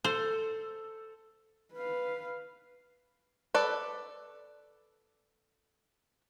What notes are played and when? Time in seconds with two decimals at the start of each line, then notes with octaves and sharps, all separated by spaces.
0.04 A4 C5
1.73 B4 F5
3.54 A4 B4 D5